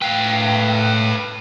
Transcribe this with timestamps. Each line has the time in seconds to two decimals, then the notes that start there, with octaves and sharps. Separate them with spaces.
0.02 A2 B4 F5 G5